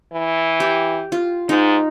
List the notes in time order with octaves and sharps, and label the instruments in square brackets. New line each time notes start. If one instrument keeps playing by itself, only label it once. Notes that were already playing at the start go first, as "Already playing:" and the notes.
[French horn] E3
[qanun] G4
F4
[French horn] G#2 [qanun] D#4